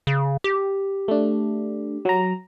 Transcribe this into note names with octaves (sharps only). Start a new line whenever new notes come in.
C#3
G4
A3 D4
F#3 A#5